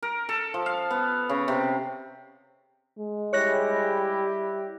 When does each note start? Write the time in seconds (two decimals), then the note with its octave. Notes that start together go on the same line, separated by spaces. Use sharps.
0.03 A#4
0.29 A4
0.54 F3
0.66 F5
0.90 B3
1.29 C#3
1.48 C3
2.99 G#3
3.33 G3 E4 G4 C#5 F#6 A#6